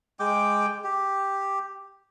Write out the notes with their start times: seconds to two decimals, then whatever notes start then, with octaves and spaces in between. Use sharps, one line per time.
0.20 G#3 G5 D6
0.84 G4